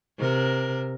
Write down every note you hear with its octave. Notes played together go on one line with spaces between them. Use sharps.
C3 A#4